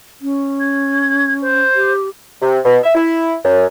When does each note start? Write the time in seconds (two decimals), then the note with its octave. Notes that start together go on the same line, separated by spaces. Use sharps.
0.21 C#4
0.60 G#6
1.41 C5
1.75 G4
2.42 C3
2.65 B2
2.84 E5
2.95 E4
3.45 F#2